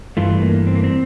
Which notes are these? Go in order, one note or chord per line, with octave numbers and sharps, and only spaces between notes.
G2 E3 A3 F4
A#3
C4
A#3
C4